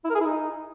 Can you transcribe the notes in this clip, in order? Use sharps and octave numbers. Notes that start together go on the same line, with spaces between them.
E4
A#4
G#4
E4
D#4